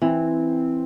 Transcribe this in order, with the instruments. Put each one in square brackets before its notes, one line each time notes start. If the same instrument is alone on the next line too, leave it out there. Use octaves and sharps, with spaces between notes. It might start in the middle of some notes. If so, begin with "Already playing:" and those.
[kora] E3 [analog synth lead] C4